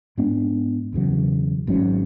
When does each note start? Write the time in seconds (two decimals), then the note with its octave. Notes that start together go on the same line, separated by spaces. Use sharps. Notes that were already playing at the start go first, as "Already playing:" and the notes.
0.17 G#2 G#3 B3 D4
0.93 E1 E2 C#3 F#3
1.67 G#1 G#2 F#3 C#4